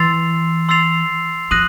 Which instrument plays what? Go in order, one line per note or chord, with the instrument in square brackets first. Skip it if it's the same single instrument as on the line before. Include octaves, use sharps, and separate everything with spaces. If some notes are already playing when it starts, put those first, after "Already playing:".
Already playing: [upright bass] E3 [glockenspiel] C6 E6 A6 C7 F7
[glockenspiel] C6 E6 A6 C7 F7
[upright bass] F3 [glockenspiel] D#6 F#6 A#6 D#7 F#7